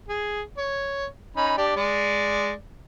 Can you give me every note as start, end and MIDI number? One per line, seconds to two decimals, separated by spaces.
0.08 0.42 68
0.58 1.06 73
1.37 1.56 61
1.37 1.56 63
1.37 1.56 83
1.57 1.74 62
1.57 1.74 67
1.57 1.74 74
1.76 2.52 56
1.76 2.52 74